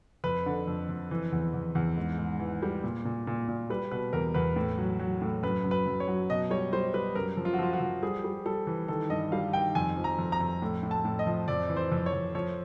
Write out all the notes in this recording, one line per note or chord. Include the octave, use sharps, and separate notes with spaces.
F2 B4
D3
F2
F2
E3
E2
E2
E2
G#2
G#2
E3
G3
A#2
A#2
A#2
A#2
G3 B4
B2 B4
E2 A#4
E2 B4
A2
F#3
F#3
A2
F#2 B4
F#2
B4
F#2
C#5
F#3
B2 D#5
G3 C#5
G3 C5
G3 B4
F#2 A#4
F3
F4
F#4
F3 F4
F#4
F3
G3 G#4
G3
G3 A4
E3
D#3 A4
G2 D#5
G3 F5
D#3 G5
F2 G#5
F3
A#5
F2
A#5
F2
A2
A2
A5
A2
D#5
F3
F2 D5
E3
C5
F2
C#5
F2
F3 C#5